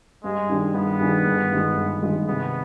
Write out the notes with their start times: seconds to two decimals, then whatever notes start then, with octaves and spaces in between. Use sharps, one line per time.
0.24 G2 G#3
0.49 D#3 G3 D4 G#4
0.74 G2 B3
1.00 D#3 G3 D4 G#4
1.26 G1
1.51 G2 D#3 G#3
1.77 G1
2.02 G2 D#3 G#3
2.28 C3 B3